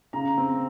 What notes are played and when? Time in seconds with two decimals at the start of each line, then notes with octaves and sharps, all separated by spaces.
0.13 C#3 A#5
0.38 C4